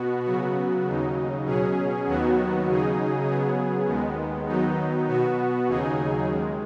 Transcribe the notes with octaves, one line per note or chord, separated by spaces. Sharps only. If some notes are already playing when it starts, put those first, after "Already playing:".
Already playing: B2 B3 F#4
C#3 F#3 B3 F#4
D#2 C#3 F#3 D#4
B2 F#3 C#4 G#4
D#2 D#3 F#3 B3 F#4
C#3 F#3 D#4 G#4
C#3 F#3 B3 G#4
D#2 D#3 G#3 B3
D#3 F#3 B3 D#4
B2 B3 F#4
D#2 C#3 F#3 D#4 G#4
D#2 D#3 G#3